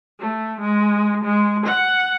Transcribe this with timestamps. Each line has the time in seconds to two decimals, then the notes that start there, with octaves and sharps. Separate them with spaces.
0.20 A3
0.61 G#3
1.24 G#3
1.66 F#5